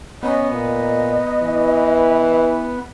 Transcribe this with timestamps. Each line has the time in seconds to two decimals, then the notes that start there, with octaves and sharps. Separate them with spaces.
0.23 B3 C#4 D#5
0.51 A#2
1.43 E3